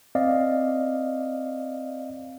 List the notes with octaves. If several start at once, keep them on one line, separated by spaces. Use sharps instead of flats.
C4 D5 D#5 F5